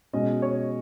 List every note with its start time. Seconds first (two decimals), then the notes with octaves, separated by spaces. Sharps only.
0.13 B2 G#3 C#4 D#5
0.42 C#5